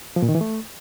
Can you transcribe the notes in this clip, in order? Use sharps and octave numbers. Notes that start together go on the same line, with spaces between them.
F3
A#2
D#3
E3
A3